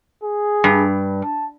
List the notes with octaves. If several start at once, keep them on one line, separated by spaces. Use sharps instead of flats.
G#4
G2
A5